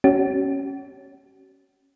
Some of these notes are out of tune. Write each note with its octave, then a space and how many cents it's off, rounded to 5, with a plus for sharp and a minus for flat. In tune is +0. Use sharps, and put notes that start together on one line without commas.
C#4 +0 F#4 +45